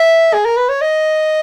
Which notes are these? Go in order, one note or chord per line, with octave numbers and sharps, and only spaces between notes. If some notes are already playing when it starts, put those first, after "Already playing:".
Already playing: E5
G#4
A#4
B4
C#5
D#5